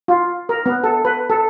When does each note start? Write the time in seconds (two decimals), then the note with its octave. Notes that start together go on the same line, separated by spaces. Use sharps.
0.08 F4
0.49 A#4
0.66 B3
0.84 A4
1.05 B4
1.30 A4